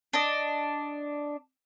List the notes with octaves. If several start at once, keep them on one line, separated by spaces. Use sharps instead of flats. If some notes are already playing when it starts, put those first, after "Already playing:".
D4 D#5